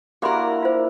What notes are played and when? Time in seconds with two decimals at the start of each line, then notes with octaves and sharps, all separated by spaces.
0.22 A#3 D4 E4 F#4 G4 A#4 B5 C6
0.63 F4 C5